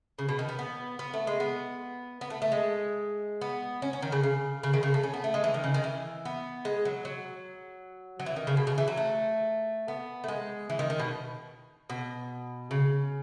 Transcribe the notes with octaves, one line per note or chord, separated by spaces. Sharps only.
C#3
B2
D#3
B3
B3
B3
A3
G#3
B3
B3
A3
A3
G#3
B3
C#4
C#4
D#3
C#3
C#3
C#3
D#3
C#3
A3
C#4
B3
A3
G#3
E3
D#3
C#3
D#3
E3
B3
G#3
F#3
F#3
F#3
E3
D#3
C#3
B2
C#3
E3
F#3
A3
B3
A3
G#3
E3
D#3
D#3
B2
B2
C#3